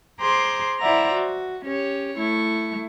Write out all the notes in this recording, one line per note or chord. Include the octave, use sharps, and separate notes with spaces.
G#4 C5 A#5 C6 D6
E4 C5 D5 E5 F#5 A#5
F#4
C#4 G4 C#5
A3 E4 C#6